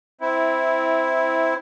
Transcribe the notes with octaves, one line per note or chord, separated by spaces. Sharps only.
C4 E4